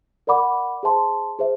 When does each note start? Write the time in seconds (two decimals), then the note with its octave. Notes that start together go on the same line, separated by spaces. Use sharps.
0.27 A#4 D5 F#5 B5 D6
0.83 G#4 C5 E5 A5 C6
1.39 G#4 C5 E5